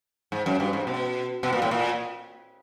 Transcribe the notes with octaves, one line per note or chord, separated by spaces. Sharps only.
G#2
F#2
G2
G#2
B2
B2
A#2
A2
A#2